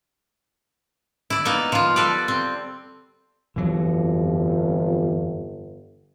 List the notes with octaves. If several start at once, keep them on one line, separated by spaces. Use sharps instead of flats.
E4 D5
A#3 B3 D#4
F3 F4
G3 A4 B4 D5
C4
G1 F2 E3 F#3